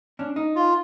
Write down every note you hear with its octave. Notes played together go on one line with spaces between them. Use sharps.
C#4 D4
D#4
F4